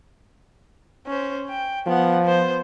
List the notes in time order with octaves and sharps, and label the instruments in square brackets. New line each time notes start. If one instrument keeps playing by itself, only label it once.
[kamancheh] C#4 C5
G5
[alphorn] F3 [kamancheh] B3 F#5
[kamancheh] B3 C5